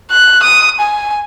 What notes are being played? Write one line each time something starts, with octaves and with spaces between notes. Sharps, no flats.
F#6
D#6
G#5